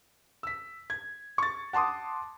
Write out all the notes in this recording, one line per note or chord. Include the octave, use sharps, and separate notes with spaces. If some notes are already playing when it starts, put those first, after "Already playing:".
E6 B6
G#6
C#6 A6
F#5 A5 C6 D6 D#6